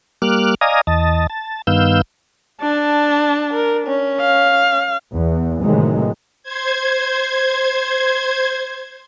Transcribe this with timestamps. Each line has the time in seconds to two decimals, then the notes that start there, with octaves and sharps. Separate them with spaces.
0.22 G3 A#3 D6 F6 F#6
0.61 D5 D#5 F5 G#5 A#5 D#6
0.87 E2 D#5 A5
1.30 A5
1.67 G2 D#3 B3 F5 E6 G6
2.62 D4 A5
3.53 A#4
3.87 C#4
4.21 F5
5.13 E2
5.60 A2 C3 D#3 E3 F#3 G#3
6.43 C5 G#6